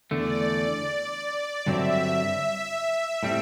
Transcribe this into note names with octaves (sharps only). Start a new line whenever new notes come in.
E2 D3 A3 D5
G2 D3 F#3 C4 E5
A2 G3 C4